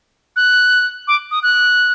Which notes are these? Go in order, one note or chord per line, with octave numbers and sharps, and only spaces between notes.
F#6
D6
D#6
F#6